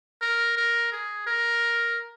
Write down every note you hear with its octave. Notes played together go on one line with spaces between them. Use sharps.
A#4
A#4
G#4
A#4